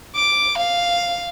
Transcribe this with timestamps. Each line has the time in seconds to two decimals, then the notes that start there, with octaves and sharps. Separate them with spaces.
0.15 D6
0.57 F5